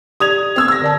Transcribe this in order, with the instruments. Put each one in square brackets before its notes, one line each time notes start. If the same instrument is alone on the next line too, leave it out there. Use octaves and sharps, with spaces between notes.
[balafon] G4 D5 [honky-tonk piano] D#6 G#6 F7
[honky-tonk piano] C4 E6 G#6
E6 A#6
[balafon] D3 D5 A5